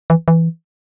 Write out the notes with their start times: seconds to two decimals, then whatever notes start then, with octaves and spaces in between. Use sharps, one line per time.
0.10 E3
0.28 E3